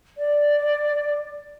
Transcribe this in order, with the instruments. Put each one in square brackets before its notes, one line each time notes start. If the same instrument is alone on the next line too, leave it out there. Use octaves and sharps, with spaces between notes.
[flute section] D5